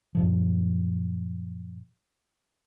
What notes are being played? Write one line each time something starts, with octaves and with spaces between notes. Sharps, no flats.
F#2 A#2 F3